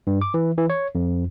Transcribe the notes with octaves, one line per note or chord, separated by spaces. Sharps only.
G2
D6
E3
E3
C#5
F2